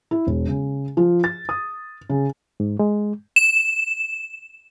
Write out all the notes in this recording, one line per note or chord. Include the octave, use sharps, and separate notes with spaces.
E4
E1
C#3
F3
A6
D#6
C#3
G#2
G#3
E7